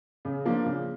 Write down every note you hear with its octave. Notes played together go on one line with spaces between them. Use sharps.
C#3
F3 A#3 D4
C#3